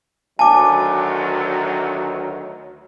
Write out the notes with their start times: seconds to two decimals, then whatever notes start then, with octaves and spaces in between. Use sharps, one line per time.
0.39 D2 D#3 F#3 G#5 A5 D6